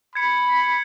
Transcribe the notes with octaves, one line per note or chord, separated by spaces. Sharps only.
B5 G#6 C#7